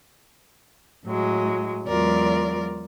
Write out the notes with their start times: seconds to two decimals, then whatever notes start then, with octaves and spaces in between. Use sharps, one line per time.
1.05 A2 F#3 G#3
1.88 E2 F#3 G#3 F4 A#4 D5